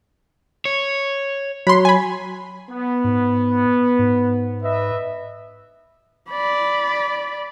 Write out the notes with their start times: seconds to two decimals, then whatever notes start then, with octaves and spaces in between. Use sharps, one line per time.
0.65 C#5
1.67 F#3 B5 C6
1.85 G#5 B5
2.70 B3
3.04 G#2
3.99 G#2
4.63 B4 D#5 E5
6.29 D5 B5